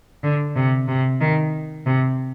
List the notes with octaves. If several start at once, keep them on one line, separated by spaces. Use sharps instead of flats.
D3
C3
C3
D#3
C3